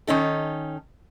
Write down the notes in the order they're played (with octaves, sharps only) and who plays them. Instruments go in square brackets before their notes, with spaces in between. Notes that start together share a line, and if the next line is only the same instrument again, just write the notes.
[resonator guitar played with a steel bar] D#3 C#4 D#4 A4